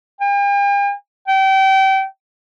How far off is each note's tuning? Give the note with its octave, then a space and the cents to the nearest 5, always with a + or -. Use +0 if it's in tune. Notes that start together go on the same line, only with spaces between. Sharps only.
G5 +45
G5 -30